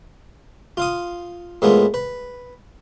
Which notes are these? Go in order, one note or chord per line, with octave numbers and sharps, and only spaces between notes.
F4 F5 D#6
A2 G#3 A#3 B3 F4
B4